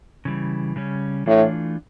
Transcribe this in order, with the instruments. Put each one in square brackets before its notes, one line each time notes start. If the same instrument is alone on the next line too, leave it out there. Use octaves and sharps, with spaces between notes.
[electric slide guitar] C#3 E3 G3
C#3 G3 C#4
[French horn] A2 [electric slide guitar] E3 A3 D4 F4